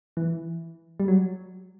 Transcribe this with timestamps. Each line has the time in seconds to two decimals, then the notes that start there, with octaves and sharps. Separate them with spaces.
0.17 E3
1.00 G3
1.08 F#3